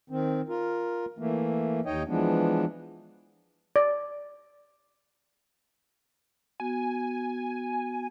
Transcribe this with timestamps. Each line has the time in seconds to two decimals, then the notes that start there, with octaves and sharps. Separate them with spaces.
0.10 D#3 C4
0.49 F4 A#4
1.18 E3 A3 A#3
1.86 D#2 D#4 C#5 D#5 G5
2.08 E3 F3 G#3 B3 D4
3.76 D5
6.60 B3 F#4 G#5